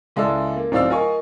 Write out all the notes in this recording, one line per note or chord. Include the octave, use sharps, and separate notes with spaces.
C#2 G#3 E4 A4 D5 E6
A#3
D1 C4 D#4 D5 F5 E6
F4 A#4 D#5 F5 G#5 C#6